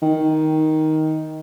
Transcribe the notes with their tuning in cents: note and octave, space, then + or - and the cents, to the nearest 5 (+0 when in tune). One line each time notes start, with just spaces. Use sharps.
D#3 +10